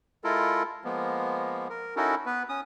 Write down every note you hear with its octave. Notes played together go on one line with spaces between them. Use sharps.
G#3 E4 F4 A4 A#4
F3 G#3 A#3 B3
A#4
C#4 D#4 E4 F#4 A4 A#4
B3 B4
C#4 D#6